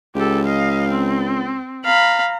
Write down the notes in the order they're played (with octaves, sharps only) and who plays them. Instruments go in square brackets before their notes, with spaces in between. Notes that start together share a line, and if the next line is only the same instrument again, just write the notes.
[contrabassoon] C#2 [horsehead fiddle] G4 A4
[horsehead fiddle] D#5 F5
C4
[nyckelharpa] F5 B5 [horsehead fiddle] A#5